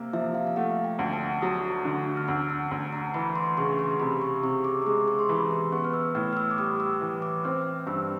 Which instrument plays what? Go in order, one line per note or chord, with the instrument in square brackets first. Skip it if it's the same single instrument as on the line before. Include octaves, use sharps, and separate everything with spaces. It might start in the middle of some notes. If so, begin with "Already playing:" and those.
Already playing: [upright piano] C3 A#3
[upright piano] F3 [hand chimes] E5
[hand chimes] F5
F5
[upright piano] A3 [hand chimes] F#5
[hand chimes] G5
[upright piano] D2
[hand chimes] A5
[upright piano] F#3 [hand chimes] D#6
[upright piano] D3
[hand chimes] F6
[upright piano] D2 [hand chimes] E6
[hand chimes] E6
[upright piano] D2
[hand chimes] A#5
[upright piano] E3 [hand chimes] B5
[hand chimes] C6
[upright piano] C#3 [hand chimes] C#6
[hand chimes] C6
[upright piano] C3 [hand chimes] B5
[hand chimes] C#6
[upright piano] C3 [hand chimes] C#6
[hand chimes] D6
C#6
[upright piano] G#3 [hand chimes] D6
[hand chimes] C#6
C6
[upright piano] E3 [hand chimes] B5
[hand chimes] C6
[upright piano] B3 [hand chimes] C#6
[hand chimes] F6
E6
[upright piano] A2 [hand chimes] F6
[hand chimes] F6
E6
D6
[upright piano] G3 [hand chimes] D#6
[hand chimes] E6
[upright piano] E3
[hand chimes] D6
[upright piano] C4 [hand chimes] F6
[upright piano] G2 [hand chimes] E6